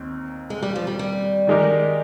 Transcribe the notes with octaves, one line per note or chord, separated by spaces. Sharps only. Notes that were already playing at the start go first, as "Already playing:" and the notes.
Already playing: D#2 D#3 C4
G#3
G3
F3
G3
G3
D#3 G#3 D#4 G4 A#4